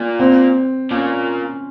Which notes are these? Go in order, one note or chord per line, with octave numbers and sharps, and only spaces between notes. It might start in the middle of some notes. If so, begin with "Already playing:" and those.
Already playing: A#2
C4
A#2 C#4